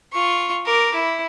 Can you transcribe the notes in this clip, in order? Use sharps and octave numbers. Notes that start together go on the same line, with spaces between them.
F4 C#6
A#4 D6
E4